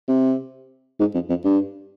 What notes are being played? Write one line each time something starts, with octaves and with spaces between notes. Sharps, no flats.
C3
G#2
F2
F2
G2